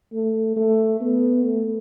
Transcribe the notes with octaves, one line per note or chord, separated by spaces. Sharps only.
A3
A3
B3
A3